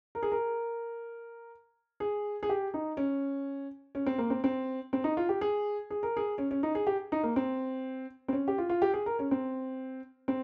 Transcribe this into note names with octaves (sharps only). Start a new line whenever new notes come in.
A#4
G#4
A#4
G#4
G#4
G4
D#4
C#4
C#4
C4
A#3
C4
C4
C4
D#4
F4
G4
G#4
G#4
A#4
G#4
C#4
C#4
D#4
G#4
G4
D#4
A#3
C4
C4
C#4
G4
F4
F4
G4
G#4
A#4
C#4
C4
C4